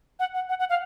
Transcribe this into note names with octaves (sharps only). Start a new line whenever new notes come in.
F#5
F#5
F#5
F#5
F5